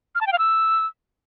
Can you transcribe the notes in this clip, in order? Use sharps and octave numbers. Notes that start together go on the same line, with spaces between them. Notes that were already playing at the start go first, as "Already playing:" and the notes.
F6
A5
G5
F5
E6